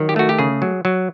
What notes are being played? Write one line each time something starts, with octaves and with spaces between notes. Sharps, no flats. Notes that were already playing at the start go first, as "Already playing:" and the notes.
Already playing: D#3 F#3
G4
A3 F#4
G4
C#3 G#4
F#3
F#3